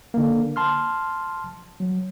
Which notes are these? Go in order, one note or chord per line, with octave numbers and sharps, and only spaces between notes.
D3 A#3
A5 C6 F6
F#3